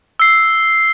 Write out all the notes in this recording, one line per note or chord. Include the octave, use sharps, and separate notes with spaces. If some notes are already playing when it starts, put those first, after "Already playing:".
E6 C7